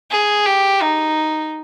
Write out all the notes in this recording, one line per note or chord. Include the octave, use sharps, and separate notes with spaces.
G#4
G4
D#4